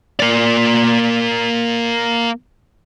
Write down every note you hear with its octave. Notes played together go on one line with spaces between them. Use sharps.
A#3 D5